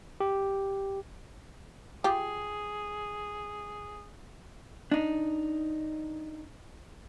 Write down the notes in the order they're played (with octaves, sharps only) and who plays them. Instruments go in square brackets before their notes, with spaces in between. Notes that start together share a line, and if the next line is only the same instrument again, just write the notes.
[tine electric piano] G4
[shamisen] F4 G4 [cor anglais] G#4
[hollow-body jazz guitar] D4 D#4